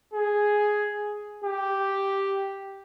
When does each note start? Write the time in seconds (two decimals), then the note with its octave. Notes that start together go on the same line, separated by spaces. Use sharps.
0.13 G#4
1.44 G4